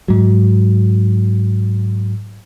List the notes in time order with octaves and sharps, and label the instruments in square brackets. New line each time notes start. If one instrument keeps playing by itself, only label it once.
[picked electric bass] G#2 F#3